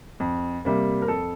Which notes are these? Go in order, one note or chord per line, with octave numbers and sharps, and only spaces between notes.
F2
C3 G3 A#3
A#4
F2 A4